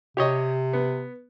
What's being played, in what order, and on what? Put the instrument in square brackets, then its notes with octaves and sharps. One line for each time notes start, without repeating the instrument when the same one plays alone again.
[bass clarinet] C3 [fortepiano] G4 C#5 D#5
[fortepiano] B3